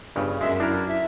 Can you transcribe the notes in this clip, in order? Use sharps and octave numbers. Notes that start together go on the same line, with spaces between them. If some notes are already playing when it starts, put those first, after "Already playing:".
G1 G2 C#3
F#2 G#3 E5
D4 E4 A#4
E5